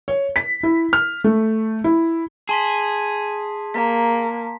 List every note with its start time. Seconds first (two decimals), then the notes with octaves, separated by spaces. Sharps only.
0.08 C#5
0.36 B6
0.63 E4
0.93 F6
1.24 A3
1.84 E4
2.49 G#4 A5 C6 B6
3.74 A#3 A#5 B6